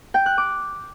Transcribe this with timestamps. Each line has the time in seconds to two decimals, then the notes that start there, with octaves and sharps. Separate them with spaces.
0.14 G5
0.26 F#6
0.38 D6